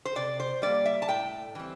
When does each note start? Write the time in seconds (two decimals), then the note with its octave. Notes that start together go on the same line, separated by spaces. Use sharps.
0.05 C5
0.16 C3 D5
0.40 C5
0.62 G3 A#3 D5
0.86 E5
1.02 A5
1.08 A2 G5
1.55 E3 G3 C4